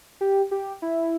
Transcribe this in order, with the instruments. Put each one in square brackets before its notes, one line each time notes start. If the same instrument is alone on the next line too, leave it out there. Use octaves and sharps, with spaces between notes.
[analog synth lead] G4
G4
E4